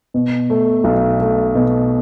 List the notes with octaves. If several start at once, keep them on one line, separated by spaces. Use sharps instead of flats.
B2
A3
B1
A3
B2